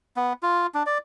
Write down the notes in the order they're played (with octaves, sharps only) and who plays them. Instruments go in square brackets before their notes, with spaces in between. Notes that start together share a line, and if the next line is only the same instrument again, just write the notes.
[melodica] B3
F4
D4
D5